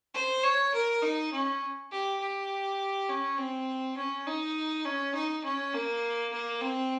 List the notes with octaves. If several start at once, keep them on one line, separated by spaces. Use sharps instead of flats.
C5
C#5
A#4
D#4
C#4
G4
G4
C#4
C4
C#4
D#4
C#4
D#4
C#4
A#3
A#3
C4